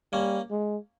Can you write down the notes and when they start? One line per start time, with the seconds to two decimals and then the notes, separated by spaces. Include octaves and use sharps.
0.13 G3 A#3 C#4
0.51 G#3